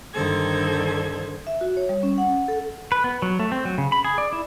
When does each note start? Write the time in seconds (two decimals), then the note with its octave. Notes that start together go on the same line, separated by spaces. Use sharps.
0.14 G2 D3 D#3 A4 C5 G#6
1.47 E5
1.61 F#4
1.77 C#5
1.89 G3
2.03 C#4
2.18 F#5
2.48 A4
2.92 B4
3.04 B3
3.22 F#3
3.40 A3
3.52 C4
3.65 F#3
3.78 C#3
3.92 B5
4.05 G#4
4.18 D5
4.33 E4